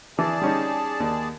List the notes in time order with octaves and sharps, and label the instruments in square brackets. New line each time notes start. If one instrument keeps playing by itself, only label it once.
[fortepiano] E3 [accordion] G#4 D5 A5
[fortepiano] G3 C#4 D#4
D#2